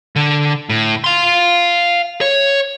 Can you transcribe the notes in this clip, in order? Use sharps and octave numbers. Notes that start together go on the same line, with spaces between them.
D3
A2
F5 C6
C#5